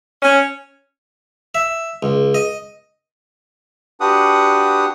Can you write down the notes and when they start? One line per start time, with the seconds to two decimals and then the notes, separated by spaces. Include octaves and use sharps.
0.22 C#4
1.55 E5
2.03 C#2
2.34 D#5
4.00 D4 F#4 G4 B4 F#5 D#6